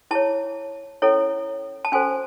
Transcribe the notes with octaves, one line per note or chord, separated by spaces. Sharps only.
E4 G#4 C#5 A5
C#4 E4 A4 C#5
A5
C#4 F#4 A4 C5 G#5